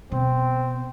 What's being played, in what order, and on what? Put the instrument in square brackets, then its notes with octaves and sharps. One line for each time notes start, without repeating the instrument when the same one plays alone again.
[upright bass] B2 [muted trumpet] C4